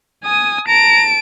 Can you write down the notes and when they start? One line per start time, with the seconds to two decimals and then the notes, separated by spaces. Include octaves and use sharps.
0.25 G#5 D#6
0.68 A5 A#5 D7